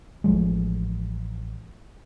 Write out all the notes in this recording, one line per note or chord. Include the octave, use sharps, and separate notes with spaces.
A1 A2 F3 G#3